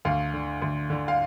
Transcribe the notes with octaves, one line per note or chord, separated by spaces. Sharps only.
D2 F5
D3
D2
D3
F5